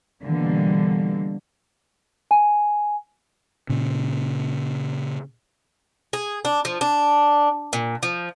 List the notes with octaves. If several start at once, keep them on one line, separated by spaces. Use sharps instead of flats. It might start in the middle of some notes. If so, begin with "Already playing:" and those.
B2 D3 E3 G3 A#3
G#5
A#2 C#3
G#4
D4
F3
D4
A#2
F3